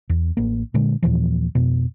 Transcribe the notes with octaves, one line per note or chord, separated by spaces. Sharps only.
E2
A1 A#3
A#2 D3 G#3
D#2 A#2 E3 F3
F2 B2